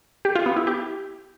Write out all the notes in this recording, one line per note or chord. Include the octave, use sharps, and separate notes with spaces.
G4
F4
B3
E4
G4